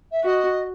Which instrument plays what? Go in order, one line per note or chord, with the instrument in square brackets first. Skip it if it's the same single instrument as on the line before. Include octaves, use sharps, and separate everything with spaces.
[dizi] E5
[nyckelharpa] F#4 [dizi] E5
[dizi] D#5